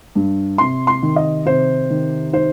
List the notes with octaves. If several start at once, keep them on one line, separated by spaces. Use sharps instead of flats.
G2
C3 C6
C6
D#3
D#5
C3 C5
D#3
D#4 C5